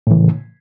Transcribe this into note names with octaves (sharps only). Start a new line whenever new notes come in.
A2 C#3 E3